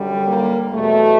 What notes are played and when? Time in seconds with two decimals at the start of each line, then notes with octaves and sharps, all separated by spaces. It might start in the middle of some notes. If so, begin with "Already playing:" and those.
Already playing: F#2 D3 G3
0.27 A#3
0.71 E2 B2 F#3 A3